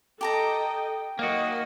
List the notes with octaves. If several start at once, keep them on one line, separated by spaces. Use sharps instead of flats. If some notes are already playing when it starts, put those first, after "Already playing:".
G4 A4 D#5 G5 A5 A#5
D#3 F#3 A#3 F#4 D#5